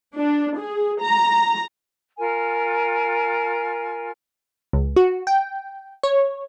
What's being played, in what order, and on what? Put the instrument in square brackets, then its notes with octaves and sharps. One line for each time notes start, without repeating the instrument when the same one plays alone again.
[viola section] D4
G#4
A#5
[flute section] F4 A#4 G#5
[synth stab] C#2
F#4
G5
C#5